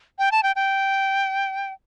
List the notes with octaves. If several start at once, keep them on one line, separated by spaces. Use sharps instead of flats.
G5
A5
G5
G5